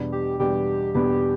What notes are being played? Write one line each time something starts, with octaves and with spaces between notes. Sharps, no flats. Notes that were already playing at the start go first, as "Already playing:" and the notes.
Already playing: E2 B2 G3 B3 D4
G4
E2 B2 G3 B3 D4 G4
E2 B2 G3 B3 D4 G4